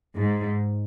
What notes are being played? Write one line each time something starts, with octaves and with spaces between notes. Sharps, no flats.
G#2